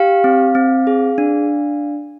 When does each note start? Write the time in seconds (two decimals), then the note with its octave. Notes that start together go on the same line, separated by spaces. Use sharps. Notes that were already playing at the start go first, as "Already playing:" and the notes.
Already playing: G4 F5
0.24 C4
0.55 C4
0.87 G#4
1.18 D4